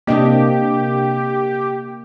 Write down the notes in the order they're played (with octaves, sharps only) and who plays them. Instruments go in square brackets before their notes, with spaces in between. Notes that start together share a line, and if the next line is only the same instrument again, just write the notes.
[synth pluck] C3 C4 D4 [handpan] A#3 D#5 [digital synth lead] G4